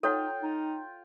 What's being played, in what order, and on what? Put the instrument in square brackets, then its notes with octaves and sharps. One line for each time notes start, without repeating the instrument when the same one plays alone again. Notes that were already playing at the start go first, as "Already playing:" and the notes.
[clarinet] D#4 [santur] F4 G5 [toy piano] A4 C#5 F#5
[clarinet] D#4